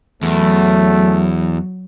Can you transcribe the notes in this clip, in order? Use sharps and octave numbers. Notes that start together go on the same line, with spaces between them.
E2 F#3 A3